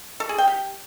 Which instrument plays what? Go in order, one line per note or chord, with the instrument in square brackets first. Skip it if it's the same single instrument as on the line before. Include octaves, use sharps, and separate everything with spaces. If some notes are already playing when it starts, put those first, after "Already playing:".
[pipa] A4
G#4
G5
G4